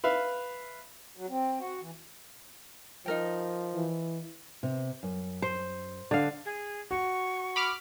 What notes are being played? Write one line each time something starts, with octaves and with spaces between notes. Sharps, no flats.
B4 E5 F5
F#3
C4
F#4
E3
F3 D#4 A#4 G5
E3
C3
F#2
C5
D3 F5
G#4
F#4 C#6
B5 D6 F6